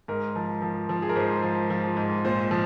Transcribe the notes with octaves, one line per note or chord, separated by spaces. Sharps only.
G#2 A#4
F3
F3
F3
G#4
A#4
G#2 C5
F3
F3
G#2
A#2 C5
F3